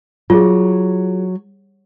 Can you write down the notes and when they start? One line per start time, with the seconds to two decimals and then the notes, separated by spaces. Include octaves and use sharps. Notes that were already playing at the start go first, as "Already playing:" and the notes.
0.30 F#3 F4 G#4